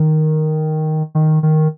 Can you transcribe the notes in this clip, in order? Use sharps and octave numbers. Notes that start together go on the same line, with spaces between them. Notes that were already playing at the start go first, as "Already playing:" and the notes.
Already playing: D#3
D#3
D#3